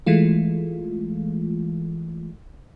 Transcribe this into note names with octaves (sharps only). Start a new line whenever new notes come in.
E3 G#3 A3 F4